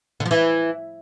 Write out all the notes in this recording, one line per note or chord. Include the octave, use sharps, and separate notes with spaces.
D3
F3
E3